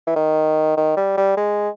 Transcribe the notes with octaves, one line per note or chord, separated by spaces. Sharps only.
E3
D#3
D#3
G3
G3
G#3